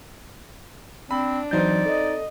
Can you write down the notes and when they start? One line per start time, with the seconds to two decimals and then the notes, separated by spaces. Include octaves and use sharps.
1.11 C4 D4 B5
1.51 E3 F#3 C4 D#4 C5 D5 G6
1.86 A4 D#5